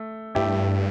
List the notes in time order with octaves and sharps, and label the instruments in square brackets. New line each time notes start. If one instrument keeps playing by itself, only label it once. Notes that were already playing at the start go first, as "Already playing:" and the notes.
Already playing: [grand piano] A3
[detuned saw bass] G2 [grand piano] A3 E4 G4